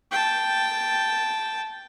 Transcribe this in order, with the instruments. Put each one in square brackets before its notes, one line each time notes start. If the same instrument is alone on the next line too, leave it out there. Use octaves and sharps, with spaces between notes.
[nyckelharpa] G5 A5